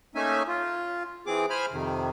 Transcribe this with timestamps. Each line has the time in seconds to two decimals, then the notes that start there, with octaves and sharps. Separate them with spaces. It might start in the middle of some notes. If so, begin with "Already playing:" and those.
0.15 A3 A#3 C#4 D#4 E5 G#5
0.48 F4
1.27 E3 C4 G#4 D6
1.50 C5 G#5 B5 F6
1.72 F2 C3 D#3